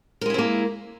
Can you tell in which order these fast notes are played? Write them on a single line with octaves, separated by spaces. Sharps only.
A#4 G#3 E4 C4 A#3